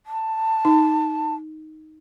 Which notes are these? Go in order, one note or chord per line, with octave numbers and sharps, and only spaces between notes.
A5
D#4